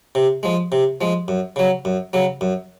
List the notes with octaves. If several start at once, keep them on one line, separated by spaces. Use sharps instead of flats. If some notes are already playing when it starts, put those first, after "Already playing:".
C3
F3 G#3
C3
F3 G#3
F#2
C#3 F#3
F#2
C#3 F#3
F#2